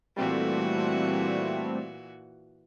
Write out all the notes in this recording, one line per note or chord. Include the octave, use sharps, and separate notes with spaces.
A#2 E3 G3 A3 C4 F#4